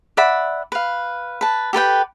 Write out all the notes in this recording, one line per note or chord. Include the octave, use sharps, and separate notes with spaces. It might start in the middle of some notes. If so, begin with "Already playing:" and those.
D5 E5 F#5 B5
B4 F5
B4 A5
G4 A4 B4 G5